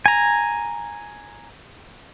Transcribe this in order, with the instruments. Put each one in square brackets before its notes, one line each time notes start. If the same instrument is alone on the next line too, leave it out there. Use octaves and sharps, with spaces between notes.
[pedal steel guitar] G#5 A#5